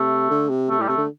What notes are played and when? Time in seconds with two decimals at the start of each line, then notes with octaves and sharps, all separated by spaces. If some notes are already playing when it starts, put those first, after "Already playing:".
Already playing: C3 A3
0.30 D3
0.49 C3
0.69 C3 A3
0.79 A2 G3
0.89 C3 A3
0.98 D3